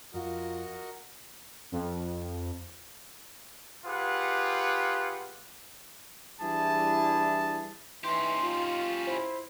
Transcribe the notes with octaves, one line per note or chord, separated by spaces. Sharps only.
F2 F4 F#4 A#4 D#5
F2
F4 G4 G#4 B4 F#5
E3 G3 D4 E4 G#4 A5
E3 C#4 D#4 G4 C6
F4
E4 C5